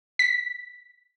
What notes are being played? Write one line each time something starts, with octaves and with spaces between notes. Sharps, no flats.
B6